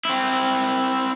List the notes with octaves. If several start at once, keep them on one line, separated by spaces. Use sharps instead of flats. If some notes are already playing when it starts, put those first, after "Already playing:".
C4 E4